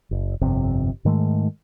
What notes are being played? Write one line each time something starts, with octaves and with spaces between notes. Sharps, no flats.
F#1
G1 F2 C3
G#2 D#3 G#3 A3